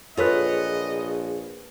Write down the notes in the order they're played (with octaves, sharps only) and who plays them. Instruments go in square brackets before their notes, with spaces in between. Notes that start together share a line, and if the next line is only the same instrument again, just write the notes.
[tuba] A#1 [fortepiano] F4 A4 B4 [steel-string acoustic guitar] G#4 C#5 [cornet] D#5